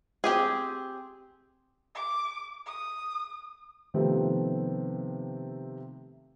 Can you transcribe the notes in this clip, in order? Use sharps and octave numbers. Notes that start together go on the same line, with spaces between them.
C4 G4 G#4
D6
D#6
C3 D#3 F3 A3 B3 C4